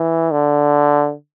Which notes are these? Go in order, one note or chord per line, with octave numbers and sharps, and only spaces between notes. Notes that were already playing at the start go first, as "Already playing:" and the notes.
Already playing: E3
D3